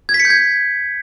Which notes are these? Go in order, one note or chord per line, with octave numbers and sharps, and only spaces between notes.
G#6
B6
C#7
G6
G#6